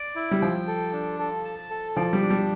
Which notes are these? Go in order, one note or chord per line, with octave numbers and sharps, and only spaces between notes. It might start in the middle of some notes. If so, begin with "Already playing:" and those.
Already playing: D5
E4
G3
F3 G5
A4
D4
A4
A5
A4
F3 D5
G3
D4
G3